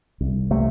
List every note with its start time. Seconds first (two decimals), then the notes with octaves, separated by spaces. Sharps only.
0.21 C2
0.51 C3 A3